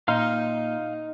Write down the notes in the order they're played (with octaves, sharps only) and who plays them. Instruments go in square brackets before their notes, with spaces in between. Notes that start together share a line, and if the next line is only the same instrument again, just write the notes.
[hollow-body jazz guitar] A#2 [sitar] D#4 [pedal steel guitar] F5 C6 F6